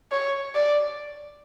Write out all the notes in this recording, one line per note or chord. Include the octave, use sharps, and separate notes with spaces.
C#5
D5